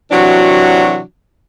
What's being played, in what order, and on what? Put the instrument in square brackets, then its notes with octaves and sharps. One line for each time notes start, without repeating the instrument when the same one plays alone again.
[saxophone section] C3 E3 F#3 D4 F#4